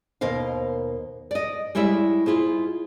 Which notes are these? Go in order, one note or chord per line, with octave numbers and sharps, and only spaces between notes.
D#2 B2 A#4 C5 F5
D5 D#5
G3 G#3 E4 C#5 D5 E5
E4 F4 G#4 C5